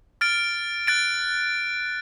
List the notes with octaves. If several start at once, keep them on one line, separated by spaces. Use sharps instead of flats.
F6 A6 D7
F#6 A6 D7